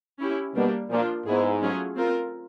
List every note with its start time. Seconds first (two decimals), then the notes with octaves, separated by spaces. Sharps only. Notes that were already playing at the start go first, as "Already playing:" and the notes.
0.20 C#4 E4 G4
0.55 B2 G3 A#3 D4
0.90 A#2 F3 A#3 D4 F4
1.26 G#2 B3 E4 G#4
1.62 F#3 A3 C#4 F4 G#4
1.97 C4 F4 A#4